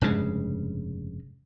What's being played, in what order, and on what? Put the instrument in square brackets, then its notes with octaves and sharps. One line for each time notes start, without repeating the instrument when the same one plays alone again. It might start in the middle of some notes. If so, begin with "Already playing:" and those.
[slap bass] F1 G2 C#3 G#3